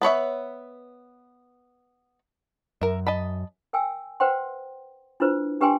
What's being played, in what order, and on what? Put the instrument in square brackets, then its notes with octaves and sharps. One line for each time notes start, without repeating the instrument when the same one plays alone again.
[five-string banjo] B3 B4 C#5 E5
[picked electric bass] F#2 [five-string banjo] A#4 E5
[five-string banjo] D#5 A5 B5
[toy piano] A#4 G5 G#5 E6
B4 C5 F#5 G5 C6
D4 E4 F4 B4 C5
D4 G4 B4 G5 G#5 C6